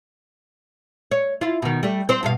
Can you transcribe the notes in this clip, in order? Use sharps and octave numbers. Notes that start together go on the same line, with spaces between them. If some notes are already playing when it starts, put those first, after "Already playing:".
C#5
E4 F4
B2 D#3
G3 A3
C4 C5
G2 B2 F5